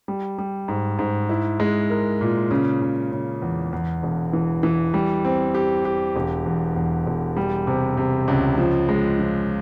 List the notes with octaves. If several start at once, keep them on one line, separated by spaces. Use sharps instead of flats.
G3
G3
G#2
G#2
E4
G#3
A#4
A#2
C#3
C#3
C#3
E2
E2
E1
E3
E3
G3
C4
G4
G4
E1
E2
E2
E1
G3
C3
C3
C#2
F3
G#3
F3